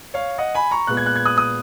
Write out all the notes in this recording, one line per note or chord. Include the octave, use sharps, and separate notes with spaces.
C#5 F5
D#5 F#5
G#5 B5
A#5 C#6
A#2 G#3 B3 F#6
G#6
F#6
G#6
D#6 F#6
D#6 F#6